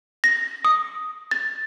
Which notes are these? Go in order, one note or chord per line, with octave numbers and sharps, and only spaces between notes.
A#6
D#6
A6